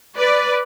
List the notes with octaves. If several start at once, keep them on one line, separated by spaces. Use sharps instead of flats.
B4 D5